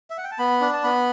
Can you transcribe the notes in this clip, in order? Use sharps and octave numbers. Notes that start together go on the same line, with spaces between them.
E5
F#5
G5
A5
B3 B5
D4
A5
B3 B5